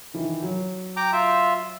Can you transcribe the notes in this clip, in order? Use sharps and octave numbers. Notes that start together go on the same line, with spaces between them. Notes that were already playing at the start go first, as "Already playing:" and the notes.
D#3 E3
F#3
G5 A#5 D6
F4 E5